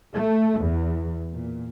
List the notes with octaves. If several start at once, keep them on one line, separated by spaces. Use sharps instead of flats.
A3
E2
A#2